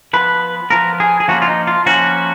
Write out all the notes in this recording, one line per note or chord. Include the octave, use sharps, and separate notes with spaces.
F3 B3 B4
F3 B3 A#4
G#4
G#4
F3 A#3 C#4 F#4
F4
D#4
F4
F3 A#3 C#4 F#4